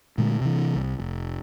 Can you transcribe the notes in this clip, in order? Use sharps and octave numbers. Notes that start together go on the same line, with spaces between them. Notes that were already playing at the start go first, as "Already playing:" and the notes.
A#2 D3 G#3 A3
C3 E3
C2
F1